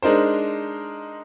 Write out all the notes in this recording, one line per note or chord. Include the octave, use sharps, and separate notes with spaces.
G#3 D4 D#4 A#4 C5